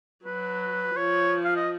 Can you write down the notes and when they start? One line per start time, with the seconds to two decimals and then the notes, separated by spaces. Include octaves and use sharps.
0.24 F#3 B4
0.96 F3 C#5
1.44 F5
1.56 D#5